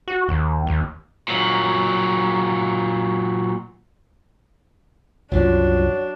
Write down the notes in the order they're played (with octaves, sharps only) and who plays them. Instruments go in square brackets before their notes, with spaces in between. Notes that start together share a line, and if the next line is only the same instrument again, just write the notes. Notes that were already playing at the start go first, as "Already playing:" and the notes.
[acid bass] F#4
D#2
D#2
[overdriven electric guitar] A#2 F#3
[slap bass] C2 F#2 F3 [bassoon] F#3 [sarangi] D4 [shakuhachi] F4